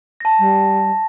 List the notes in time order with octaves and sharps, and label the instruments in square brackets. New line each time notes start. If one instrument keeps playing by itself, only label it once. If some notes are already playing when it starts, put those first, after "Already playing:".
[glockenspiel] A5 A#6
[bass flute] G3